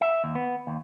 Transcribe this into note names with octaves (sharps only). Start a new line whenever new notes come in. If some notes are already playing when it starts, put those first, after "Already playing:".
E5
D#2
B3
D#2